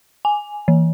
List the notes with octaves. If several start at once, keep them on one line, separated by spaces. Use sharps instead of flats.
G#5
E3